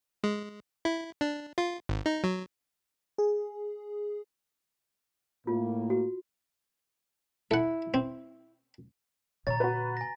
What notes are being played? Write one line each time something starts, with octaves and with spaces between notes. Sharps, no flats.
G#3
E4
D4
F4
G#1
D#4
F#3
G#4
A2 A#3 F4
F#4
E4 A4 F#5
C4
A#2 D3 C#5 A#5 A6
F#4 B4
G#5 A#6